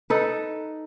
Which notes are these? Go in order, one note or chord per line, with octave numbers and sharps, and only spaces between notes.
D#4 A4 B4